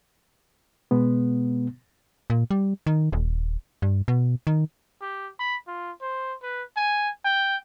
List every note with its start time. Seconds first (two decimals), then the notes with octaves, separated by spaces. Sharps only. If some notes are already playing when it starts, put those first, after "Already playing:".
0.91 B2 G#3 B3
2.30 A#2
2.51 G3
2.86 D#3
3.12 D#1
3.82 G2
4.08 B2
4.47 D#3
5.01 G4
5.39 B5
5.67 F4
6.01 C5
6.43 B4
6.77 G#5
7.25 G5